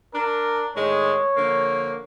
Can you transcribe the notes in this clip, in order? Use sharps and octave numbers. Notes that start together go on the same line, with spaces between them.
D4 A#4
A2 D#3 G#3 C#5
D3 F3 A#3